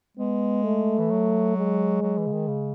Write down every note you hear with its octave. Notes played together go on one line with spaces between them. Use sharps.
G#3 B3
A3
E3
F#3
G#3
F#3
E3
C#3
D#3
C#3